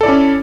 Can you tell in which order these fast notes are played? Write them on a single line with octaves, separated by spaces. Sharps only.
A4 D5 E4 C#4